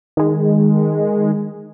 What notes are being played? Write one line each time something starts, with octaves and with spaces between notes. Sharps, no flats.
D#3 G#3